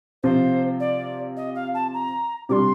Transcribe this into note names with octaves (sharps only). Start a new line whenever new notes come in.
C3 F3 C4 F4 C5
D5
D#5
F5
A5
A#5
C3 G3 D4 C6 D6